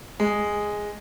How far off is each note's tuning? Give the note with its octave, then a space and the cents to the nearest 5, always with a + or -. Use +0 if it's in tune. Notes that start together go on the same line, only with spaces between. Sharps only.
G#3 -5